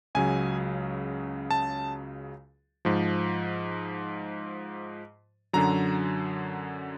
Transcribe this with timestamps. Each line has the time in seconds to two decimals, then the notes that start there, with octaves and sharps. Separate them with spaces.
0.15 C#2 C#3 F#3 G#5
1.51 A5
2.85 G#2 F3
5.53 F#2 D3 F#3 A#5